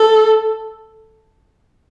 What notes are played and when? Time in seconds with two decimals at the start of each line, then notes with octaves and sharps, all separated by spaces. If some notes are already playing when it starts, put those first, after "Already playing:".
Already playing: A4